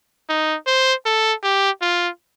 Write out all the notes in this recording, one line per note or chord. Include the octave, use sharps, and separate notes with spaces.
D#4
C5
A4
G4
F4